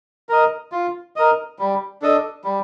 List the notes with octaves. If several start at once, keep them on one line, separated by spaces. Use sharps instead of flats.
A#4 D#5
F4
A#4 D#5
G3
D4 A4 D#5
G3